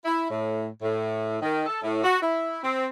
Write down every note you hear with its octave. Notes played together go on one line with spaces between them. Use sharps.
E4
A2
A2
D#3
A4
A2
F#4
E4
C4